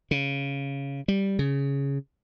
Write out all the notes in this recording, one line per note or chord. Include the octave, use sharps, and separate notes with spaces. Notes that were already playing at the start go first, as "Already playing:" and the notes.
C#3
G3
C#3